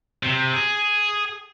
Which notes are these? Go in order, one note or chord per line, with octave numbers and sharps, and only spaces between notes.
C3
G#4